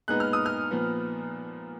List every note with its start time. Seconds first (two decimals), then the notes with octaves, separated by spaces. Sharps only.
0.08 A#2 G#3 B3 D#4 F#6
0.20 F6
0.33 D#6
0.46 F6
0.71 A#2 F3 B3